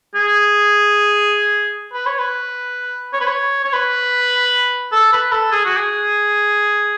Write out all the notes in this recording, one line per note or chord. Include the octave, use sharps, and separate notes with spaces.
G#4
B4
C#5
B4
C#5
B4
C#5
C#5
B4
A4
B4
A4
G#4
F#4
G#4